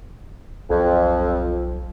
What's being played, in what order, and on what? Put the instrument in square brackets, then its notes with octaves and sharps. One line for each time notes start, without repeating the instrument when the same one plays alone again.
[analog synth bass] B1 [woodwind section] F2